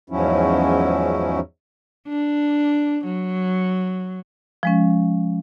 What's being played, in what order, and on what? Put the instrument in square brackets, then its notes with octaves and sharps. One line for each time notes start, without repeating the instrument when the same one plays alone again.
[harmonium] E2 G#2 F3 F#3 C#4 E4
[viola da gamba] D4
F#3
[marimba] F3 G#3 C#4